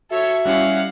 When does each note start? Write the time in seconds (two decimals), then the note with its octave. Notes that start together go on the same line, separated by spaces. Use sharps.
0.11 F#4 A4 C#5 E5
0.45 G3 C#4 E4 F5 F#5